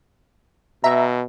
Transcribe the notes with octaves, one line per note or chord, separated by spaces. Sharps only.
B2 E5 A#5